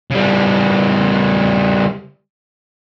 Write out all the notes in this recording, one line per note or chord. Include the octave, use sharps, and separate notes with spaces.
C#3 G3